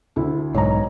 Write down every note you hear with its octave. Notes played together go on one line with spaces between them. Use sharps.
D2 E4
B1 G#2 C#5 D#5 A#5